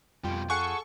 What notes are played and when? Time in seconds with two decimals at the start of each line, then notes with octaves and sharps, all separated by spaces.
0.24 F2 B2 G3 F4 G5
0.50 G#4 A4 F#5 G#5 C#6